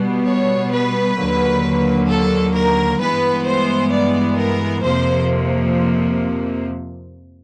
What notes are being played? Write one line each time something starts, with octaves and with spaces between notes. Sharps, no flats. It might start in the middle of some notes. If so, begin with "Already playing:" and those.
Already playing: B2 G3 B3
C#5
B4
D#2 D3 F#3 A#3
A4
A#4
G2 E3 G#3 B3 B4
C5
D5
A#4
F2 C3 F3 A#3 C5